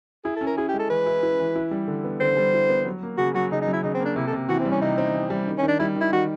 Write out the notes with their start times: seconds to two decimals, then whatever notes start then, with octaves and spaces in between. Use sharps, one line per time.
0.24 E4 G#4
0.36 A4
0.41 C#4
0.47 A#4
0.58 E4 G#4
0.69 G4
0.74 G#3
0.80 A4
0.90 E3 B4
1.06 E4
1.23 E4
1.40 E3
1.56 E4
1.71 G3
1.88 D3
2.04 B3
2.21 D3 C5
2.37 G3
2.54 E4
2.70 B3
2.85 F#3
3.03 A#3
3.18 C#3 F#4
3.34 F#3 F#4
3.52 C#3 D#4
3.62 D#4
3.67 F#3
3.73 E4
3.83 C#3 D#4
3.94 C4
4.00 A#3 D4
4.16 C3 E4
4.27 A4
4.33 C3
4.49 E3 F#4
4.60 C4
4.65 G3
4.71 C#4
4.82 C3 D#4
4.98 C4
5.14 E3
5.30 G3
5.48 D#3
5.58 C#4
5.63 D#3
5.68 D4
5.79 G3 E4
5.96 D#3 E4
6.12 D#3 F#4